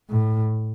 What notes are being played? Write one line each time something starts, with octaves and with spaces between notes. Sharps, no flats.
A2